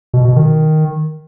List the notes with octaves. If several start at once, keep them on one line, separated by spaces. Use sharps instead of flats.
B2
B2
D#3